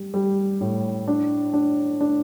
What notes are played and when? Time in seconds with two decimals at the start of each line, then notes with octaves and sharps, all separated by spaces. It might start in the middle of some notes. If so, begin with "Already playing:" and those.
Already playing: G3
0.14 G3
0.61 A2
1.08 D4
1.53 D4
2.01 D4